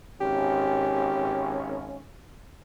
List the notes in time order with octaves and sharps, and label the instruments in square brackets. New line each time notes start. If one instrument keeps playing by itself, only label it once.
[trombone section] G#1 C#4 [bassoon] G4